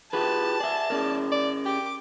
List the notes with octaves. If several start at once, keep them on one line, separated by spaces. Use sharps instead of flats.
F4 G4 G#4 B4 A5
G#4 D5 E5
C#4 G#4 A#4 D5
D5
G4 D6